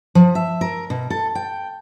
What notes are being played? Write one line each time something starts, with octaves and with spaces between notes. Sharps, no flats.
F3
E5
A#4
B2
A4
G5